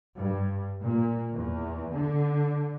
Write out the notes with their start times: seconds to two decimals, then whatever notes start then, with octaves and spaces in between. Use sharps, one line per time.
0.16 G2
0.84 A#2
1.32 E2
1.91 D3